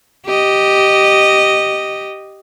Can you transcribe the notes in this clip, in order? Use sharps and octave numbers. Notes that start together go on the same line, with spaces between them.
G4 D#5